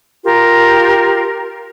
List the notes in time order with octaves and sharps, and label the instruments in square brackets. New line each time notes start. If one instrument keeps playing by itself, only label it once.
[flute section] F4 G4 A#4